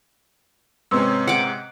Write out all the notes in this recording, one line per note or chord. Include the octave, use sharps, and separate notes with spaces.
G#2 C3 C#4 B4 C6 E6
F#5 D6